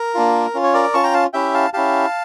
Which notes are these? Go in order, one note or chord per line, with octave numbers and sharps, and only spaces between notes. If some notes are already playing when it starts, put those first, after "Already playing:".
Already playing: A#4
A#3 D4 F4
C#4 F4
C#5
A#4 D5
D6
C#4 F4 A5 C#6
G5 A#5
F5 A5
C#4 E4 G4 E5 G5
F5 A5
C#4 E4 G4 F5 A5